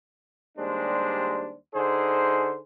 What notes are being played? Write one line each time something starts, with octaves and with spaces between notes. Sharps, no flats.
D#2 G3 G#3 D4 C5
D3 D#4 G#4 C5